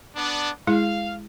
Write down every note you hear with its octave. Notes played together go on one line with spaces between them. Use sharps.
B3 D4
G#3 E4 G#4 F5